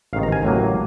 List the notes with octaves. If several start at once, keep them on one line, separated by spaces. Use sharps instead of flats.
A1 G#2 D#3 F5
A#5
G#5
A1 A2 F#3 A#3